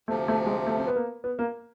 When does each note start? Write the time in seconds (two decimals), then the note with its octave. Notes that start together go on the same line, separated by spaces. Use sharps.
0.08 D2 C3 F3 A3
0.28 A3
0.46 G#3
0.67 A3
0.78 C4
0.87 B3
0.96 A#3
1.24 B3
1.39 A#3